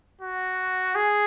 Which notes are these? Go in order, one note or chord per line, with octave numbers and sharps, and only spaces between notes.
F#4
G#4